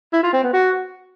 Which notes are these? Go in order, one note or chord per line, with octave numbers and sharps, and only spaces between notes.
E4
F4
C4
B3
F#4